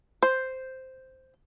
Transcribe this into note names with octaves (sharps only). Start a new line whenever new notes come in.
C5